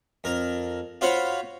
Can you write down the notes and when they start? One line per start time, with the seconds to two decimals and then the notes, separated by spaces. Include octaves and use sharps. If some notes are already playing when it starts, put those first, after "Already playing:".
0.24 F2 A#4
1.01 F4 F#4 C5 C#5 F5 B5